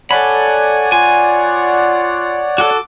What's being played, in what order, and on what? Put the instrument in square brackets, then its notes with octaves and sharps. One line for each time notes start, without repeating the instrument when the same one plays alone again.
[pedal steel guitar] A4 B5 [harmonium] C#5 D5 F#5 [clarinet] G#5
[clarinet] F4 [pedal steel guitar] G#5
[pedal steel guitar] F#4 A4 [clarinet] D6